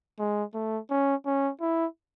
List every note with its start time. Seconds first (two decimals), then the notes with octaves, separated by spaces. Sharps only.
0.19 G#3
0.54 A3
0.91 C#4
1.26 C#4
1.61 E4